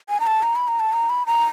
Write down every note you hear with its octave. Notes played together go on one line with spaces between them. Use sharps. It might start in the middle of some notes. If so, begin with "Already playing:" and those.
G#5
A#5
A5
A#5
B5
A#5
A5
A#5
B5
A#5